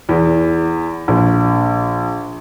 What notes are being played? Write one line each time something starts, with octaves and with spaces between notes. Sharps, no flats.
E2
A#1